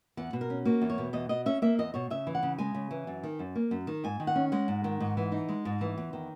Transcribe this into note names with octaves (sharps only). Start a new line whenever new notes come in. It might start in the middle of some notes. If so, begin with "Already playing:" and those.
E2 F#5
B2
A#4
C#4
A#3 F#4
E2
C#5
B2
E2 D#5
B2 D#5
C#4 E5
A#3 E5
E2 D#5
B2 C#5
C#3 E5
E3
F#5
C#3
G#3 G#5
C#3
E3
F#2
D#3
F#2
A#3
F#2
D#3
G#2 G#5
D#3
F#5
C#4
G#3 F#5
G#2
D#3
G#2
E3
D#4
G#3
G#2
E3
E2
D#3